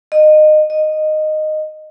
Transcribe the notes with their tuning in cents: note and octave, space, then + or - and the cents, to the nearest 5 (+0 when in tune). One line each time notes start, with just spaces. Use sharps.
D#5 -25
D#5 -10